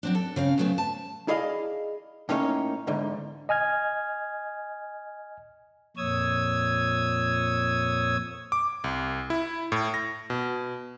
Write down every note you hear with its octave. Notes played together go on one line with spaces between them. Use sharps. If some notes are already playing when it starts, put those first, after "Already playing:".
F#3 C4 D4
A4
C#3 C4 F5
C#3 F#3 A3 B3 C4
A5
E4 G#4 D5 D#5 F5
A2 A#3 C#4 D#4 B4 C#5
E2 G#2 D3
D#5 G#5 F6 G#6
F2 A#2 C#5 D#6 E6 G#6
D6
C2
E4
A2
A#6
B2